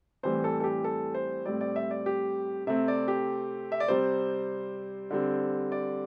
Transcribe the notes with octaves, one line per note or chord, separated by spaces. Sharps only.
A2 E3 G3 C4 C5
A4
A4
G4
A4
C5
A2 G3 C4 D5
D5
E5
D5
G4
C3 A3 C4 E5
D5
G4
E5
D5
C3 G3 C4 C5
D3 G3 C4
D5